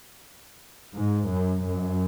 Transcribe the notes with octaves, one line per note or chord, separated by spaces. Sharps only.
G#2
F#2
F#2